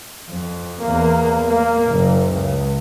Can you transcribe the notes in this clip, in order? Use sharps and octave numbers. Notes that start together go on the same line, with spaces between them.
F2
E2 A#3
A#3
F#1
C#2